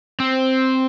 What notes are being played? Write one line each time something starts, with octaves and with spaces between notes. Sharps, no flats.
C4